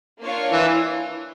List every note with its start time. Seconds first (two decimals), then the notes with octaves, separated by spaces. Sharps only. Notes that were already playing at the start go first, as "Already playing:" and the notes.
0.19 A#3 D4 F4 C#5 F5
0.53 E3